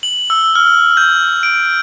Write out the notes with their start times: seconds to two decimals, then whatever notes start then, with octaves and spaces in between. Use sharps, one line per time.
0.03 F#7
0.30 E6
0.55 F6
0.97 G6
1.43 D7